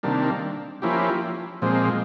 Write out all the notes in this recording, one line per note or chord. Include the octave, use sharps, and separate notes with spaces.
C3 D#3 G3 A#3 D4
F3 A#3 C#4 E4 G4
A#2 F3 G#3 C4